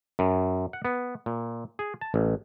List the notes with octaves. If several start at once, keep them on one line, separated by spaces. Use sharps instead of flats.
F#2
F#5
B3
A#2
G#4
A5
A1